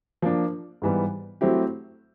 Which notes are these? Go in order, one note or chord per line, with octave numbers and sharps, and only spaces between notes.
F3 A#3 D4
G#2 E3 G3 B3
F#3 A3 C4 E4 G4